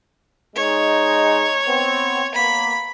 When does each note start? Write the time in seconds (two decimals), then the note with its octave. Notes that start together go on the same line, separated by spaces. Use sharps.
0.56 G#3 D#4 C#5
1.66 B3 C4
2.34 A#3 B3 B5